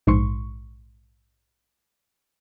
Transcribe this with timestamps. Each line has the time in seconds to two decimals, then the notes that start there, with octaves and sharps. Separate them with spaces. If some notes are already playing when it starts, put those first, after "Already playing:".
0.07 A#1 G#2 C6 C#6